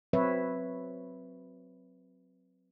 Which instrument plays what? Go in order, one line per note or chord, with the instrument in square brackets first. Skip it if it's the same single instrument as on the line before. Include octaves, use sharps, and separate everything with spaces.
[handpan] F#3 C4 B4 C#5 E5